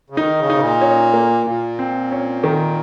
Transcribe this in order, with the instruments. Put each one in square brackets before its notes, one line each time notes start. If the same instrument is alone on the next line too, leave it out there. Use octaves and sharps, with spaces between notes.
[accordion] C#3
[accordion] D#3 [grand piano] D#4
[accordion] C#3
[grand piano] D#4
[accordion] C3
A#2
[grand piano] C#4
A#3
[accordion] A#2 [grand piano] F4
[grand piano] C4
C#4
D#3